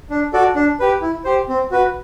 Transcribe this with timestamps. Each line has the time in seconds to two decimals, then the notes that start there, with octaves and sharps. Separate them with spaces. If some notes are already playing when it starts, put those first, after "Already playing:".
0.10 D4
0.33 F#4 A4 D5
0.55 D4
0.80 G4 B4
1.02 E4
1.24 G4 C5
1.49 C4
1.71 F#4 B4